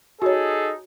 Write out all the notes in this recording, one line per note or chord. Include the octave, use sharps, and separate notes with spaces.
D#4 F#4 G#4 A4 C#5